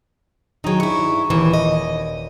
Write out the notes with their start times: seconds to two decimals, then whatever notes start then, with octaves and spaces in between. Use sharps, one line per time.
0.64 D#3 F#3 D#4 G#4
0.80 G2 E4 C#6
1.30 D#1 E3 E7
1.53 D#5